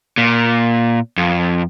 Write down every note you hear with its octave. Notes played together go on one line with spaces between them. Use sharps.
A#2
F2